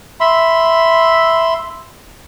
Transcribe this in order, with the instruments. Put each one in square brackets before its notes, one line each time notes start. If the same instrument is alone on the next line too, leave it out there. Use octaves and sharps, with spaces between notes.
[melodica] E5 B5 C6